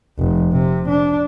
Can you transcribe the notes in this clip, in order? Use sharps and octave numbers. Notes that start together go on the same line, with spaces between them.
F1
C3
D4